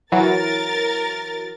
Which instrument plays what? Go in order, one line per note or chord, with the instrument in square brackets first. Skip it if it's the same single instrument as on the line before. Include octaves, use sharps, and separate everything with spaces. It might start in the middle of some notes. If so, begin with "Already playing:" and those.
[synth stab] E3 F#3 [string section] A#4 A6